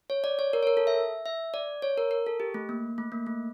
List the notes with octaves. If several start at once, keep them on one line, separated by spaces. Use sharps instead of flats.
C#5
D5
C#5
A#4
C#5
A#4
A4
E5
E5
D5
C#5
A#4
A#4
A4
G4
A3
A#3
A3
A#3
A3